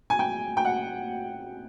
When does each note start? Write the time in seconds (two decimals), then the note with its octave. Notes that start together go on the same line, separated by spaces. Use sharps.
0.10 G#5
0.19 G5
0.57 G5
0.65 F#5